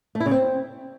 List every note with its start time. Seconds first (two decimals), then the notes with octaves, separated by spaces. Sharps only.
0.15 A3
0.20 E4
0.26 C#3
0.31 C4